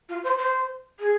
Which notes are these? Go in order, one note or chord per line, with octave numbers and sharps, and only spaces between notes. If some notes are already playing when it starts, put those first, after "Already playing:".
F4
C5
C5
G#4